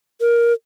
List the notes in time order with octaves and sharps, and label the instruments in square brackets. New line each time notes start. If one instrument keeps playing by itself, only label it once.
[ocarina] A#4